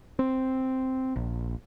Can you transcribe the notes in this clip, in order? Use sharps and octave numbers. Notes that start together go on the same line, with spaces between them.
C4
A#1